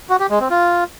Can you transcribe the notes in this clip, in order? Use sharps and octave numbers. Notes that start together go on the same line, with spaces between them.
F#4
G4
G#3
C4
F4